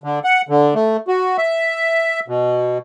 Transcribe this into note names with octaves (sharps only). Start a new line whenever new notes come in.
D3
F#5
D3
A3
F#4
E5
B2